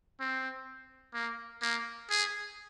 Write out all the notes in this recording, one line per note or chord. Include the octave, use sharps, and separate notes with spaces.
C4
A#3
A#3
G#4